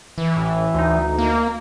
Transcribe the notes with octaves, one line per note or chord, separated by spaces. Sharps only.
E3
A1 A2
D2 D#4
A#3